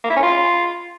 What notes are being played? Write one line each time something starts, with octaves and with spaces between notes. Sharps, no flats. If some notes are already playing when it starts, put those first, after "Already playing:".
A#3
E4
C#4
F4